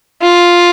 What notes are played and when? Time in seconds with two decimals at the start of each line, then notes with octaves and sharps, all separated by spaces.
0.21 F4